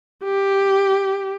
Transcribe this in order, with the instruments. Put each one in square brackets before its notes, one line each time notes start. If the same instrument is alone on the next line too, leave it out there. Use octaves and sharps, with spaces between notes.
[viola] G4